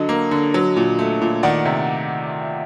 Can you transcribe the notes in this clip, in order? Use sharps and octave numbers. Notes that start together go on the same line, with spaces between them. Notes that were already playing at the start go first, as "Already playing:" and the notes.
Already playing: D3 F#3 D#5
A#3
D3
F#3
A#2
A3
A#2
D#3 D5 F#5
C3